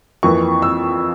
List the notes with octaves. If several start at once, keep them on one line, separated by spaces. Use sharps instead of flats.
F2 E3 A#3 C#6
E6